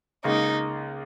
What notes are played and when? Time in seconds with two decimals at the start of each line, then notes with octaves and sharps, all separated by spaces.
0.24 C#2 C#3 A#3 D#4